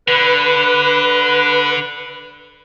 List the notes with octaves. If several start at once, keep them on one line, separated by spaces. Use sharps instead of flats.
D3 B4